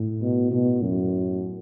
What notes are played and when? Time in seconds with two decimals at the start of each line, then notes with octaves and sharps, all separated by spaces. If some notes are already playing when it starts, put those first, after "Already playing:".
Already playing: A2
0.22 B2
0.51 B2
0.82 F#2